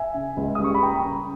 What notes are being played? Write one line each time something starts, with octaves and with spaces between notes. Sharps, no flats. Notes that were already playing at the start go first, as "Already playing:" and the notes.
Already playing: E5 G#5
C#3
C#2
D#6
G3 C#6
B5
A#3 G5 A#5
C#3